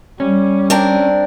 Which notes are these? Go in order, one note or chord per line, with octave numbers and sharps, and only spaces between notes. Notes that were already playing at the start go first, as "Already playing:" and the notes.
G3 C#4
C4 D4 A#4